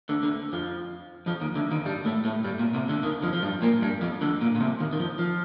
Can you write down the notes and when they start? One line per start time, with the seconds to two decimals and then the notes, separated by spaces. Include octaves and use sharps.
0.09 D2 D3
0.23 D2 D3
0.53 F2 F3
1.26 F2 F3
1.41 D#2 D#3
1.56 D2 D3
1.71 D#2 D#3
1.85 G2 G3
2.05 A2 A3
2.25 A2 A3
2.44 G2 G3
2.59 A#2
2.73 C2 C3
2.89 D2 D3
3.03 D#2 D#3
3.23 F2 F3
3.33 F3
3.42 G2 G3
3.62 A#2 A#3
3.82 G2 G3
4.01 F2 F3
4.21 D2 D3
4.41 A#2
4.56 A#2
4.60 C2 C3
4.80 D#2 D#3
4.93 D#3
5.00 F2 F3
5.19 F3